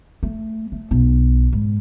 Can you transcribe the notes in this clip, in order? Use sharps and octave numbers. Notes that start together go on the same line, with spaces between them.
A3
A3
B1
G#2